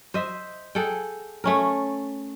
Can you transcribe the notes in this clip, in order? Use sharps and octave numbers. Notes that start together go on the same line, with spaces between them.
C5 D#5 E5
G#4 A4 F#5 G5
A3 C#4 A#4